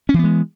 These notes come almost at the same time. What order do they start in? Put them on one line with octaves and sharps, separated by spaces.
C#4 E3 B3 G#3